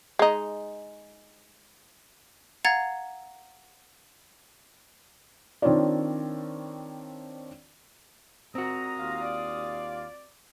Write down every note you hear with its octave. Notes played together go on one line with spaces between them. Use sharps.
G#3 D#4
F5 F#5 A#5 G#6 A6 C#7
D#3 C4 D4 F4 C#5 D5
A#2 G#3 C4 F#4 A#5 D#6
D#2 F4 F5
D5